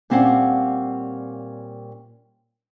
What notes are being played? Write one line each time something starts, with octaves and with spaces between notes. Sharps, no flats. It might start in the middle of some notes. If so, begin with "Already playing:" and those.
A#2 G3 C4 C#4 F5 F#5